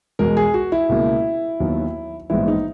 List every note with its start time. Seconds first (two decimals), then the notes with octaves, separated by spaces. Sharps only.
0.19 E2 B2 G#3 A#4
0.37 G#4
0.54 F#4
0.72 E4
0.89 C#2 B2 A#3
1.60 D#2 D#3 F#3 B3
2.30 A#1 G#2 E3 B3 E4
2.48 D#4